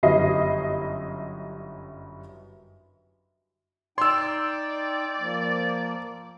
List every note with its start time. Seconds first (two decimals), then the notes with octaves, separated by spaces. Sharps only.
0.03 G1 F#2 G3 E4 D#5 C7
3.98 D#4 D5 G5 C6 E6
5.20 F3 A#3